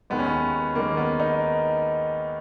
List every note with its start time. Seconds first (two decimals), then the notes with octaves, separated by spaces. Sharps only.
0.10 D#2 D#3 G#3 B3
0.19 C#4
0.26 B3
0.75 D#2 D#3 G#3 A#3
0.97 B3
1.20 D#4